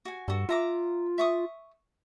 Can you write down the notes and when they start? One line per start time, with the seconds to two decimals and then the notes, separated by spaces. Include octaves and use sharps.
0.05 F#4 G#5
0.28 G2 F#4 A4
0.49 F4 E5 A#5 D6
1.18 E5 C#6 D#6